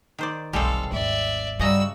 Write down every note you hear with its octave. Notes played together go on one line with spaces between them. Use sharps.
D#3 C5 D5
F1 B1 G3 G#3 C4 A4 F5
G#1 D#2 D5 E5
G2 C#3 G3 F#4 D#5 A#5 E6